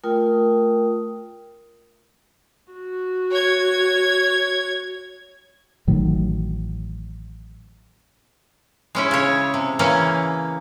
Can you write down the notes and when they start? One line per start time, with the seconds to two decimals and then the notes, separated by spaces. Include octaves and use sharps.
0.04 A3 F4 A#4 G5 D#6
2.72 F#4
3.31 C#5 G#6
5.87 A1 A2 D#3 F#3
8.95 G#3 C#4 E4
9.11 C#3 C#5
9.54 C3
9.79 C#3 E3 A#3 C#4